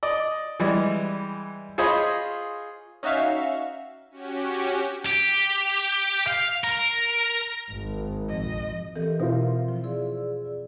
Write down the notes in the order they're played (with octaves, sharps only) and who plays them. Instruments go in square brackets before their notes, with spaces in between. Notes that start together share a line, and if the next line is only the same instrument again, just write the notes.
[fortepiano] D5 D#5
E3 G3 G#3
F4 G#4 C5 C#5 D#5 B5
[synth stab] C#4 D#4 F#4 E5 F5
[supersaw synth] C#4 F#4 G4
[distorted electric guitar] G4
F5
A#4
[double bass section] G#1
[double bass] A#1 F2 [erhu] D#5
[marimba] E3 C4 A4 [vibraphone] G4 A#4 D#5
[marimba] B2 [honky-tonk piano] C4 E4 F4 [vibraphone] A#4
[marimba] F3
[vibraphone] G#4 D5 E6